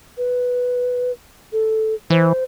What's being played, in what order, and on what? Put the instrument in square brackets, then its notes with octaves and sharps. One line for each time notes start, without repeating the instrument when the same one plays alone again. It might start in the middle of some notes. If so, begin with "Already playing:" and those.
[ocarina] B4
A4
[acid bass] E3 [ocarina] C5